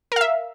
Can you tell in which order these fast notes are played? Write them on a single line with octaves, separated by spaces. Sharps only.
A#4 F5 E5